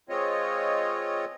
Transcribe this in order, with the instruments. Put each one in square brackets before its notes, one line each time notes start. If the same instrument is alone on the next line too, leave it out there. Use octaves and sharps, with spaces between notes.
[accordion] G#3 C4 F4 C#5 D#5